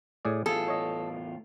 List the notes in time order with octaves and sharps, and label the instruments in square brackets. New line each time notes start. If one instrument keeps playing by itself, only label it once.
[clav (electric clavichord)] A2 G#4 D5
[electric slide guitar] E2 A2 F4 [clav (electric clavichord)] G#4 [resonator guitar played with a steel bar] A4
[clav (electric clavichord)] C#5 D#5